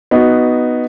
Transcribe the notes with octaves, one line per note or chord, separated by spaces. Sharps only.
B3 D#4 F#4